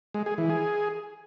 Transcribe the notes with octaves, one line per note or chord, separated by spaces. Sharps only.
G#3
G#4
E3
G#4